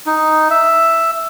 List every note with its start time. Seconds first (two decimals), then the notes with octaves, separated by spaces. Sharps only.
0.06 D#4
0.50 E5